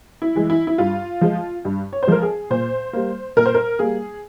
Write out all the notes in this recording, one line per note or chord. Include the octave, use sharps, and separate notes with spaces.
E4
E3 G#3
E4
E4
G2 F4
F3 G#3
G2
C#5
C5
F3 G#3 A#4
G#4
A#2 C5
G3 A#3
A#2 A#4
C5
A#4
G3 A#3 G#4